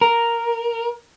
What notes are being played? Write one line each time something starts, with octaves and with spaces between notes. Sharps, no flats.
A#4